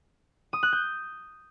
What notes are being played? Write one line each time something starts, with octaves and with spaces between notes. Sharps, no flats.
D#6
F#6
G6